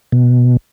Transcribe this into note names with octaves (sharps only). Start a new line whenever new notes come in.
B2